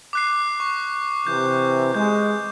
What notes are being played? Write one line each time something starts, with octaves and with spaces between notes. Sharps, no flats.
D6 F#6 C7
C#6
C3 E3 G6
G#3 G6